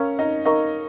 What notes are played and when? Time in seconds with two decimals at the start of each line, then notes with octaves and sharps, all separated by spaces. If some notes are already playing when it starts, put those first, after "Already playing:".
Already playing: C#4 A#4 F5 A#5 C#6
0.19 D#4
0.45 D#4 A#4 F5 A#5 C#6